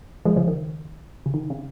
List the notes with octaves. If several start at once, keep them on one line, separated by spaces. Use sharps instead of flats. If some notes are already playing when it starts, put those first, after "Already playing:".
F3 G#3
C#3 F3
D#3
C#3
D#3
C#3